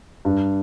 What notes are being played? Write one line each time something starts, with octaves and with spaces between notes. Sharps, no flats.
G2